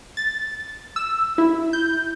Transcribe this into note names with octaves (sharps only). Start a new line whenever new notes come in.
A6
E6
E4
G6